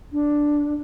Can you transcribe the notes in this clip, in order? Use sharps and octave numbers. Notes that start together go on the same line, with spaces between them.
D4